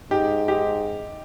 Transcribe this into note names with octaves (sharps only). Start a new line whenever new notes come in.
G#2 D#4 G4
D#4 G4